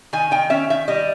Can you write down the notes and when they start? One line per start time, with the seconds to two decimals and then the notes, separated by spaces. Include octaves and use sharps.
0.13 D#3 G#5
0.31 D#3 G5
0.50 C#4 E5
0.70 D#3 E5
0.88 G3 D#5